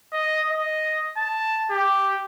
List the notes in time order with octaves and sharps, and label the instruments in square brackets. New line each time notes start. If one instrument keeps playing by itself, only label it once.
[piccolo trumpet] D#5
D#5
A5
G4